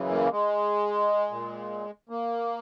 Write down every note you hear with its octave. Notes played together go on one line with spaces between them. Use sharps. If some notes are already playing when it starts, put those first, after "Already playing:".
Already playing: F#2 C#3 E3
A#3
G#3
A#2
A#3